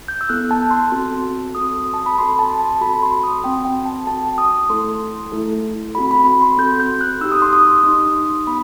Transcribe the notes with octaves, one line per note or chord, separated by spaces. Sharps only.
G6
E6
B3 E4 A4 F#6
A5
C6
C4 F#4 A4
C4 F#4 A4 D#6
A5
B5
C4 F#4 A4 C6
A5
A5
C4 F#4 A4 B5
B5
C6
D#6
C4 F#4 A4 G5
G5
A5
C4 F#4 A4 A5
D#6
A3 E4 A4 C6
A3 E4 A4
C4 F#4 A4 B5
B5
B5
C6
C4 F#4 A4 G6
G6
F#6
D#4 G4 E6
D#6
C6
D#6
D#4 G4
B3 B5